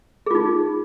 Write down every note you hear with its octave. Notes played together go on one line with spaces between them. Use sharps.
D#4 F4 G#4